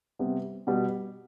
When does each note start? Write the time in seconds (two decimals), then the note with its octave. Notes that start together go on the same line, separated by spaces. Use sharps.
0.19 C3 G3 B3
0.67 B2 G3 B3